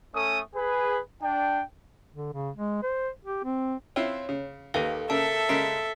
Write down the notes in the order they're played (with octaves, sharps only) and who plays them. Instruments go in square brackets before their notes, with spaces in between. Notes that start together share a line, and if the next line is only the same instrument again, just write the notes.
[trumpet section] A3 C#4 A4 D#6
G#4 B4
D4 G5
[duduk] D3
C#3
G#3
C5
G4
C4
[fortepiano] C4 E4 F4 [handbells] C#5
[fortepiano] C#3
[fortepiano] D#2 D#3 [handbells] A4 B4 F5
[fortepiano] C#3 A#3 [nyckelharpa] A4 E5 [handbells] A5
[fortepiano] C#3 G#3 A#4 [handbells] B6 C7 D7